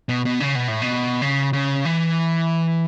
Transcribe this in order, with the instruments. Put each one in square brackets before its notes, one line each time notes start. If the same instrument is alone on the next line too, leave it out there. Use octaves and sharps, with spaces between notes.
[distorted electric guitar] B2
B2
C#3
B2
A2
B2
C#3
C#3
E3